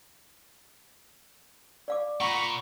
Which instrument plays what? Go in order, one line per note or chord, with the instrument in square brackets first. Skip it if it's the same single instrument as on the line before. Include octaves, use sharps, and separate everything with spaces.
[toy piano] D5 F5 D6
[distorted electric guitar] A#2 [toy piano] F#5 [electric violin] A#5 B5 [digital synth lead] C#6